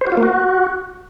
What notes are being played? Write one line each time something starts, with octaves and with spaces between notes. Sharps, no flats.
C5
F#4
F4
A#3
F#4